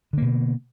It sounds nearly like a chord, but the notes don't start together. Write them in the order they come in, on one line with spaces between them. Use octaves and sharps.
D3 A#3 B2